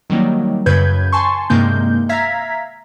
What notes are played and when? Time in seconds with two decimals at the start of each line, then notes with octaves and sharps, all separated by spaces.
0.10 D#3 F#3 G3 A#3
0.66 F#2 C#3 B4 G6 G#6
1.13 G#5 A5 C6 C#6
1.50 G2 C3 D#3 G#3 A#3 G6
2.09 E5 F5 A#5 G#6 B6